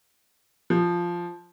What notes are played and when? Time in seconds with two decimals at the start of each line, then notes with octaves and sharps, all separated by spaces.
0.70 F3